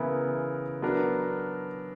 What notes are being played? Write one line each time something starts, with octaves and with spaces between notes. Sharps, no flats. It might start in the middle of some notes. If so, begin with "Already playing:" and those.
Already playing: C#3 E3 B3 E4 A#4
F#3 B3 D4 A#4